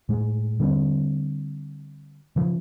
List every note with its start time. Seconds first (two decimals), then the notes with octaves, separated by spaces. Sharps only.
0.09 A2 G#3
0.60 D3 G3 A3 C4
2.36 C#3 F3